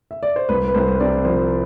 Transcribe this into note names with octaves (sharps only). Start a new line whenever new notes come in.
E5
D5
C5
C2 B4
B4
C2 C5
C3 D5
F3 C5